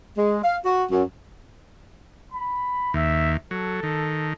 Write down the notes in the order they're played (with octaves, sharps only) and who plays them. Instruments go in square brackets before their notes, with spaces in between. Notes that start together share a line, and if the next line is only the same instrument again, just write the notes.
[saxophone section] G#3
F5
F#4
F#2
[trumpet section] B5
[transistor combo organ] D#2 [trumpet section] E5
[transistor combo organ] F#3 [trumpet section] A4
[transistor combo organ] D#3